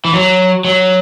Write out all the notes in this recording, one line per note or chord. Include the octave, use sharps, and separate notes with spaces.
E3
F#3
F#3